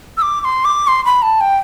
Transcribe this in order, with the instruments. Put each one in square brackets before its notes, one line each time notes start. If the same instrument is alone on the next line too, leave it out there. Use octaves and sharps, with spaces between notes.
[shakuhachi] E6
D6
D6
C6
D6
C6
B5
A5
G5